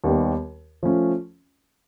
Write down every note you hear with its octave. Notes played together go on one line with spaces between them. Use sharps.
D#2 D#3 G3 B3
F3 A3 C#4 F4